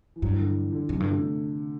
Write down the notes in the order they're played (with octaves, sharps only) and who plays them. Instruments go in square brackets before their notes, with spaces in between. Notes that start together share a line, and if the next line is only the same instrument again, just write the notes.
[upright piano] E3
[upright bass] G2 [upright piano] F#3
[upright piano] E3
D3
D3
[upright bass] F#2 [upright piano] C3
[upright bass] G2 [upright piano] D3
[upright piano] A3